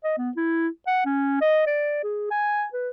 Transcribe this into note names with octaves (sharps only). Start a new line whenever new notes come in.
D#5
B3
E4
F#5
C#4
D#5
D5
G#4
G#5
B4